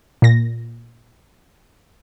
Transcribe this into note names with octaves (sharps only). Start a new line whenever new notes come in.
A#2 A#6